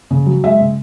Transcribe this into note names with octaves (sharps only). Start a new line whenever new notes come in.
C#3
F#3
G#3 E5
C#3